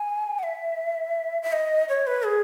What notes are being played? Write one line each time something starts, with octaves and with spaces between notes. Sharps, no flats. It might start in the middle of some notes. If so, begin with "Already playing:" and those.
Already playing: G#5
F#5
E5
E5
D#5
C#5
B4
G#4